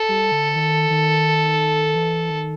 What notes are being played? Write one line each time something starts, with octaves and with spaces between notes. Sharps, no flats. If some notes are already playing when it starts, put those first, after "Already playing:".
Already playing: A4
G3
D3
D#3
D#3
E3
D#3